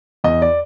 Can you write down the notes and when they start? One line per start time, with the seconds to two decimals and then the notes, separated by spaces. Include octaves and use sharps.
0.24 E2 D#5
0.42 D5